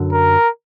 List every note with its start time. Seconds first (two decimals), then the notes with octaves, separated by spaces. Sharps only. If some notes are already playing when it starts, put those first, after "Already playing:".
Already playing: F#2 D3 F#3
0.13 A#4